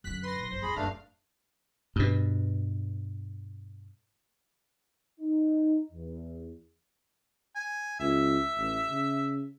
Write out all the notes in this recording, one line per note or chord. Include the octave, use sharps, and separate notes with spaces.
F#2 D3 F#6 B6
B4 C6 A#6
B1
G1 C5
F2 C4 G#4 B5
F#1 G2 A3 C#4 D4 F5
G2 B2
D#4
E2
G#5
C#2 E5
A1
C#3